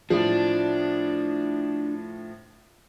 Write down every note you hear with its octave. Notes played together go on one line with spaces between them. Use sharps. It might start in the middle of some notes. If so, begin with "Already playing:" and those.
A2 F3 D4